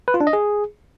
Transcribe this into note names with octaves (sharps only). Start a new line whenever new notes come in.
B4
F4
D4
D#5
G#4